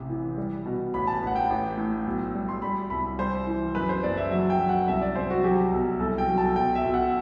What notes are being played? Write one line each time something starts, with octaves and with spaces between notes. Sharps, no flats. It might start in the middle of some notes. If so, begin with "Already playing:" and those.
Already playing: A1 C3
E3
G3
B2
A1 B5
A5
A1
F#5
G5
A1
A2
B1
G3
C6
G3 B5
C2 B5
G3 C5
E3
F#2 B4
C5
F#1 D5
E5
F#3 E5
G5
F#3
F#5
C2 E5
D5
C2 C5
F#4
F#3 G4
B1
C2 A4
G5
F#3
A5
B1 G5
E5
B1
F#5